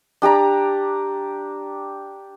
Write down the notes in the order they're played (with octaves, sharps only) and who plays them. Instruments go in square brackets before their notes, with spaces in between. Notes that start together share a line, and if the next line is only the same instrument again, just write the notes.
[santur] D4 G4 D5 A#5